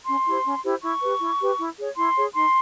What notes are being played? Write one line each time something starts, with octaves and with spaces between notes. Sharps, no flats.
C#4 C6
E4 G4 C5
C#4
E4 G4 C5
E4 C#6
G4 B4
E4
G4 B4
E4
G#4 C#5
E4 C6
G#4 C#5
D#4 C6